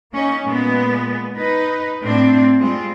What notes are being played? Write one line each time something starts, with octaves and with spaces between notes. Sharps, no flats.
A#3 C#4 D#4
A#2 G#3 B3
D#4 B4
A2 C4 D4
G3 G#3 C4 F4